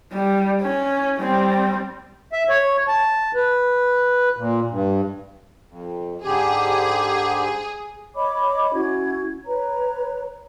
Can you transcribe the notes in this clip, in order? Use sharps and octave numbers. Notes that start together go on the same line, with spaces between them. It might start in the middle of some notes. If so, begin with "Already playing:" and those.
G3
C#4
G3 C4
E5
C#5
A5
B4
A#2
G2
F2
G#2 D3 G4 G#4
C#5 D#5 B5 D6
C#4 E4 F#4 G#6
B4 C#5 A#5